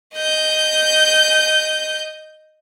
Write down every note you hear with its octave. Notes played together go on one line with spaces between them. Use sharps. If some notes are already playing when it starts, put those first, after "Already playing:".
D#5 G6